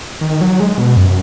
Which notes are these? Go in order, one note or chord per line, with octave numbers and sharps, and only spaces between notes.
D#3
F#3
G#3
B2
F#2